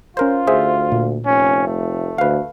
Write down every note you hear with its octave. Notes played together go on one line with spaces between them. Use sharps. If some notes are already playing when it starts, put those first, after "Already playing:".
C#4 F4 A#4 C5
D2 G#4 C5 E5
A#2
F1 C#4
A3
D2 B4 F5